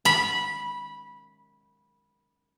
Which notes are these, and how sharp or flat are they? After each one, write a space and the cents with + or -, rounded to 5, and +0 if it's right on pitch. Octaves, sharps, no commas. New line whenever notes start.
B5 -15